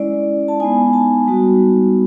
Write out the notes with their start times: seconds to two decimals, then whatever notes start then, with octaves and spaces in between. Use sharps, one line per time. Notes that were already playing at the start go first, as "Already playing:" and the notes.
Already playing: G#3 C#4 E4 D5
0.48 A5
0.60 G#3 B3 D#4 G#5
0.93 A5
1.27 G3 B3 D#4 F#4